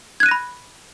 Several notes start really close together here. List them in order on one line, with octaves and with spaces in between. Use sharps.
G#6 F#6 D#7 A#6 B5